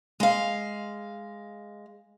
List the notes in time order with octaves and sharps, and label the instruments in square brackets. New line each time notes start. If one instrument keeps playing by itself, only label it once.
[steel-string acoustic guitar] G#3 F5